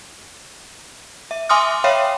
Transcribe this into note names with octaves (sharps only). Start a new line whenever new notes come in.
E5
E5 G#5 C6 D6 D#6 F6
C#5 E5 F5 G5 B5